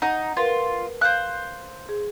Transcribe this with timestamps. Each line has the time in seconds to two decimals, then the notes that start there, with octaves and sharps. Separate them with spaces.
0.02 D#4 F#5
0.37 F4 A#4 B4
1.01 C5 F5 F#6
1.89 G#4